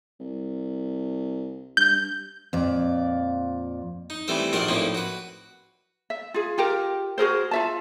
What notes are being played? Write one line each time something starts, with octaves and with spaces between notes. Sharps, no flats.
C2
G2 G6
F2 A#2 D5
D#4
E3 G3 A3 C4 C5
A#1 D#3 F#4 A#4 D5 C6
F2 A2 F3 A#3 D4 D#4
F#4 B4
E5
F4 G#4
F4 G4 A#4
F#4 G#4 A#4 C5
F4 E5 A5